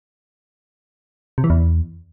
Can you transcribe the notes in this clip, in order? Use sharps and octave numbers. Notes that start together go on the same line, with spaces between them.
C3
E3
E2